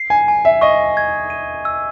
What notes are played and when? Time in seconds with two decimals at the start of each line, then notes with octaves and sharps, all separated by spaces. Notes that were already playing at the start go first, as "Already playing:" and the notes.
Already playing: C7
0.10 G#5
0.28 G#5
0.45 E5
0.61 D#5 C#6
0.97 G#6
1.30 D#7
1.65 E6